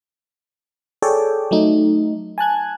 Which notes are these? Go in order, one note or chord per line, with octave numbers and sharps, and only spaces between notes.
G#4 A4 C#5 D5 G5
F#3 A3 D#4
G#5 A5 F#6 G#6